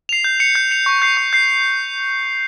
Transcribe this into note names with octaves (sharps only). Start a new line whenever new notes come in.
C7 F7
G6
C#7 F7
G6
C#7 F7
C#6
G6 C7
C#6
G6 C7